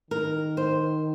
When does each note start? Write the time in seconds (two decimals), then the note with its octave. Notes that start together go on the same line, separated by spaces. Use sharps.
0.10 D#3 A#4
0.57 C5